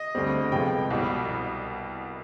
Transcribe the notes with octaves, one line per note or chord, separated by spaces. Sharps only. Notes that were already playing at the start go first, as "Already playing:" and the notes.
Already playing: D#5
D2 D3 G3 C4
F2 C3 F3 G#3 B3 G5
C2 B2 G3